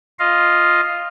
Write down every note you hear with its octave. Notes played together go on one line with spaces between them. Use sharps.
F4 D#5 F5